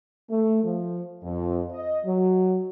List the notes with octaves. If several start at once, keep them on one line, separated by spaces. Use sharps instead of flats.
A3
F3
F2
D#5
F#3